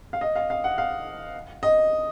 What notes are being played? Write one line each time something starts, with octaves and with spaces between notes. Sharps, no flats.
F5
D#5
F5
F5
F#5
F5
D#5